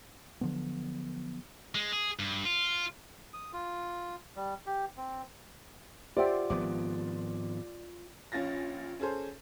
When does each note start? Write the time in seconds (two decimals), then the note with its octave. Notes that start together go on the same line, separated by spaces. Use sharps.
0.41 D3 F3 F#3 B3
1.75 G#3
1.93 G#4
2.19 G2
2.45 F4
3.34 D#6
3.53 F4
4.36 G3
4.66 G4
4.97 C4
6.17 F4 G4 C5 D5 E5 F#5 G5
6.50 G#1 F3 B3 D6
8.32 A#1 C#4 F4 A6 A#6
9.00 C#4 G#4 A4 C5